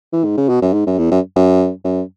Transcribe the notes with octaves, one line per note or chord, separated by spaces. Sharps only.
E3
G#2
C#3
B2
F#2
G#2
F#2
E2
F#2
F#2
F#2